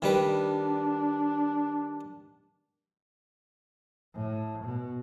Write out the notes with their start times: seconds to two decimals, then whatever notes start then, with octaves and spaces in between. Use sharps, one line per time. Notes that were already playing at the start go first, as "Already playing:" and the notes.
0.02 D#3 G3 D4 B4
4.14 A2
4.64 B2